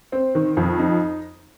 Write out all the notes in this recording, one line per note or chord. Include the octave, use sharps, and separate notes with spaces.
C4
D#3
F2
D#4